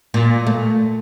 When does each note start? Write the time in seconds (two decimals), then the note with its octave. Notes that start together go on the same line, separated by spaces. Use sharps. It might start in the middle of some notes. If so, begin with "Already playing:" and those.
0.14 A#2
0.47 A3